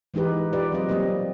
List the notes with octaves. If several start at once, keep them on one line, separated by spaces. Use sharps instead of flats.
E3 G#3 D#4 G4 B4
F4 G4 B4 D5
F#3 C4 D#5
G3 A#3 C4 D#5